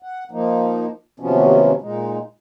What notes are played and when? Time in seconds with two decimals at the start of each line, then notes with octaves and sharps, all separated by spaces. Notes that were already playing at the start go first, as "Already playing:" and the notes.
0.03 F#5
0.31 F3 A#3 D#4
1.20 D#2 C3 F3 F#3 B3 C#4
1.81 A#2 G#3 D#4